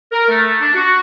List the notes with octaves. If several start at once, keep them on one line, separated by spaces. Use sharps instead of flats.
A#4
A3
D4
F#4